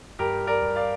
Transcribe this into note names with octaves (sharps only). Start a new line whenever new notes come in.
G2 G4 A#4
A#4 D5
G2
D5 F5